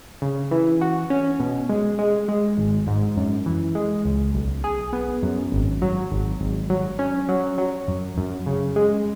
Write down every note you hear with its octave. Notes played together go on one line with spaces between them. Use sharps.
C#3
E3
F#4
C#4
B2
G#3
G#3
G#3
G#1
G#2
F#2
E3
G#3
C#2
B1
G#4
B3
F#2
G#1
F#3
G#1
G#1
F#3
C#4
F#3
F#3
F#2
F#2
C#3
G#3